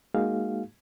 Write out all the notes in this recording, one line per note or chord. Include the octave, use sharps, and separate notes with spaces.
G#3 A#3 D#4 F#4 G#4 F5